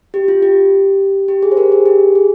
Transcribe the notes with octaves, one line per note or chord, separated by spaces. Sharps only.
G4
F4
G4
G4
G#4
C5
G4 A#4
G#4
G4
G#4